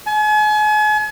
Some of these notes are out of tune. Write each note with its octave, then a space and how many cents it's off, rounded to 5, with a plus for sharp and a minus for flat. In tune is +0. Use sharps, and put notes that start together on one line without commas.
G#5 +40